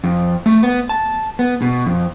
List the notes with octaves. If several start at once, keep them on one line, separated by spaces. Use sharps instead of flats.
F2
A3
B3
A5
B3
B2
F2